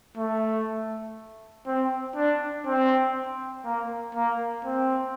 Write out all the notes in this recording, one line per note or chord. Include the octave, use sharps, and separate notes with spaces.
A3
C4
D4
C4
A#3
A#3
C4